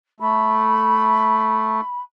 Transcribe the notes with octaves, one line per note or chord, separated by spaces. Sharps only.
A3 B5